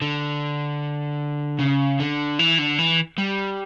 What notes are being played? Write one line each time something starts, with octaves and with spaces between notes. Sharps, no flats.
D3
C#3
D3
E3
D3
E3
G3